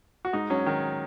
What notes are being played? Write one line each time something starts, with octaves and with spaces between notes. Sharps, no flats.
F#4
G#2 D#4
F#3 C#4
D#3